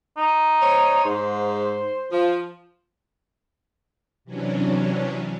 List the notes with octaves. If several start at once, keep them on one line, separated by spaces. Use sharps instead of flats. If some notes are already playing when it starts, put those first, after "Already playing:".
D#4
C5 C#5
G#2 C5
F3
C3 E3 F#3 C#4 D4